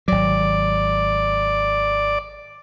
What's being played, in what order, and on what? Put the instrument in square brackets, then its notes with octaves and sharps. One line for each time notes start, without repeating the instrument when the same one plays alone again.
[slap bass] G#1 F#3 [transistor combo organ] D5